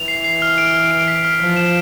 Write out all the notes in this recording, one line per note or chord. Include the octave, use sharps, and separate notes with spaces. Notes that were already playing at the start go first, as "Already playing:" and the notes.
Already playing: E3 F7
C7
C7
F6
D7
F6
D7
B6
F6
F3 F6
E7